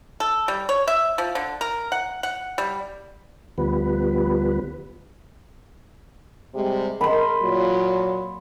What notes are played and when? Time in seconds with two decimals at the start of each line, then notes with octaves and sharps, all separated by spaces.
0.20 A4
0.48 G3
0.69 C#5
0.88 E5
1.18 F3
1.35 D3
1.61 A#4
1.92 F#5
2.23 F#5
2.58 G3
3.58 D2 F3 G3 B3 B4
6.54 C3 G3 G#3
7.01 A#4 B5 C6
7.41 A#2 F#3